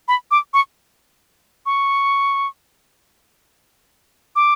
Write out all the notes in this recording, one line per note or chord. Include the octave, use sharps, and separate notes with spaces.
B5
D6
C#6
C#6
D6